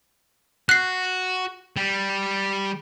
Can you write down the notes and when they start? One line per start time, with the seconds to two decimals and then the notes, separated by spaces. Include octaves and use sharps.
0.69 F#4 F#6 C7
1.77 G3